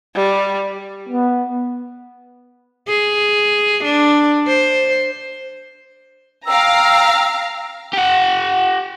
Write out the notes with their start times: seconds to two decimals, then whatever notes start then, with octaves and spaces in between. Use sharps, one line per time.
0.15 G3
1.09 B3
2.88 G#4
3.84 D4
4.47 C5
6.47 F5 G5 A#5 E6
7.93 G4 F#5